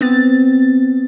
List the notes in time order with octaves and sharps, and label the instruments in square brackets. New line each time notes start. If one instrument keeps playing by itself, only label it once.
[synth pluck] B3 C4 A6